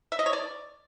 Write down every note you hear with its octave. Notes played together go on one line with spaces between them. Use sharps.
E5
D#5
C#5
D5